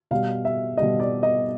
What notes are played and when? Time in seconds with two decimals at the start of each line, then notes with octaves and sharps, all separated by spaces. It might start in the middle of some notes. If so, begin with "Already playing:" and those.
0.11 B2 G3 F5
0.45 E5
0.77 B2 G3 D#5
1.00 D5
1.23 D#5